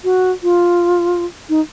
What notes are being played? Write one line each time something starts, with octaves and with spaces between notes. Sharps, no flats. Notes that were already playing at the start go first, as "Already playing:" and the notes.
F#4
F4
D#4